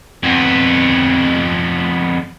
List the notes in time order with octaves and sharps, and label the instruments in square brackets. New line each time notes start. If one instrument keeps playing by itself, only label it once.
[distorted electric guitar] F2 B3